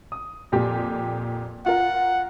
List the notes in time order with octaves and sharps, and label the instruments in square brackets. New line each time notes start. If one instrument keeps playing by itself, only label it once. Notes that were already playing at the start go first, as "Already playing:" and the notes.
[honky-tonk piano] D#6
F2 A#2 G4
[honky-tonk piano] F4 A#4 [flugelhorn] F#5